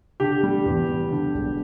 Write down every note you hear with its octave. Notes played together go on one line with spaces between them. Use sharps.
D3 G4
G3
E2
G3
D3
E1